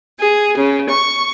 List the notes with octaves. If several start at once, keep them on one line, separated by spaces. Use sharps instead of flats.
G#4
C#3
C#6